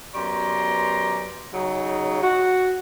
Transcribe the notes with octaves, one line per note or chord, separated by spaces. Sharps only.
F#2 B3 G4 D5 A#5 C6
C#3 F#3 D#4
F#4